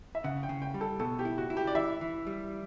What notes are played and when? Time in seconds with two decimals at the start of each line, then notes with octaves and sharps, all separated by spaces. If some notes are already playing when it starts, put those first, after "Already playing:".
0.15 E5
0.24 C#3 F#5
0.43 G5
0.49 C#3
0.62 G5
0.74 G3
0.81 A4
0.99 B2 A4
1.19 G4
1.25 E4
1.38 F#4
1.50 E4
1.57 G4
1.67 D5
1.75 E3 E5
2.01 E3
2.27 G3